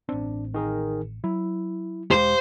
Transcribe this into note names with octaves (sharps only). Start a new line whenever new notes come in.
A1 C4 D4
D#3 G#4 A#4
F#3 E4
E1 G#3 G4 C5 F5